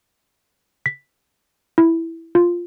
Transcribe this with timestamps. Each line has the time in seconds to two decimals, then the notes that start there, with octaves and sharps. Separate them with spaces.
0.86 B6
1.78 E4
2.35 F4